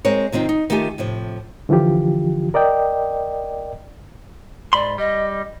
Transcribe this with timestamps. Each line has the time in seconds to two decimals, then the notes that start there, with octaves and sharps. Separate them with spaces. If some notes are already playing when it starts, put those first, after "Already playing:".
0.05 G#3 C4 A#4 C5 C#5
0.32 C3 D#3 C4 F4
0.49 D#4
0.70 D#3 A3 F4 G4 G#5
0.98 A2 C3 F3
1.69 D3 E3 F3 F4 G4
2.54 A#4 D5 D#5 G5
4.73 G#2 D5 B5 C6
4.98 G3 D#5